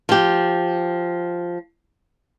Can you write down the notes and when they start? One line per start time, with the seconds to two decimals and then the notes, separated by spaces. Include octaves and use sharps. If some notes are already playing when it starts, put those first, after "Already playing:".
0.09 F3 G4